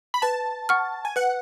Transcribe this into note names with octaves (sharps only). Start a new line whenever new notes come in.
B5
B4 A5
F#5 C#6 F6
G#5
B4 F#5